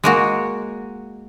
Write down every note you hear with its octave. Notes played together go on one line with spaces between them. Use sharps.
G#3 A#3 F#4